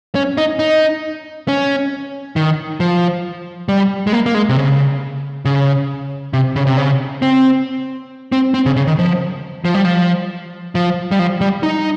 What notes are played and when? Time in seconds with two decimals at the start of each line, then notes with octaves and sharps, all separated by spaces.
0.15 C#4
0.38 D#4
0.59 D#4
1.48 C#4
2.36 D#3
2.80 F3
3.69 G3
4.07 G#3
4.13 A#3
4.26 A#3
4.35 G#3
4.49 C3
4.57 C#3
5.45 C#3
6.33 C3
6.56 C#3
6.67 C3
6.77 C#3
7.22 C4
8.32 C4
8.54 C4
8.66 C#3
8.76 C#3
8.87 D#3
8.99 F3
9.65 F3
9.74 G3
9.85 F3
10.75 F3
11.11 G3
11.19 F3
11.41 G3
11.63 D#4